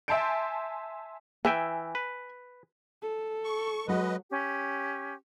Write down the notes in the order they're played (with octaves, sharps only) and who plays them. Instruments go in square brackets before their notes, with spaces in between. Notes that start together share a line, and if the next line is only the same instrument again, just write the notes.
[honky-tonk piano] E5 G#5 A5 C6 G6 D7
[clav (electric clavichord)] E3 E5 G5 [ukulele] G#5
[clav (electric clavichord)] B4
[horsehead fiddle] A4
[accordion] C#6
[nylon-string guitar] F#3 F#4 [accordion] G#3 B4 D#5
[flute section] C#4 G4